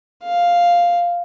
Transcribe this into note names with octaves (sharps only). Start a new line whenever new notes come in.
F5